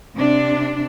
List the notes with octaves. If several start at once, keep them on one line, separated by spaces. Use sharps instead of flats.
C3 D4